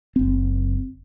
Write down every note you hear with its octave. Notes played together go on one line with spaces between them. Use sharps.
F#1 C4